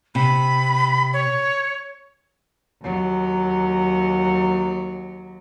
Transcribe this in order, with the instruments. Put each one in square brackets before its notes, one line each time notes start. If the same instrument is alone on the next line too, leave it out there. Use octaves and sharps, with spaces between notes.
[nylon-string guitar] C3 [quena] B5
[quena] C#5
[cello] D#2 F#3